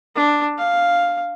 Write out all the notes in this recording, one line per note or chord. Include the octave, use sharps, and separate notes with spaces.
D4
F5